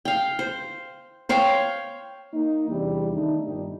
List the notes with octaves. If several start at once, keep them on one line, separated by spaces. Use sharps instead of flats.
F5 G5
C5
C5 C#5 F5 G5
A#3 D#4
E2 C3 G3 D4 E4
D#3 A3 D4 D#4
G1 A#2 G3 D#4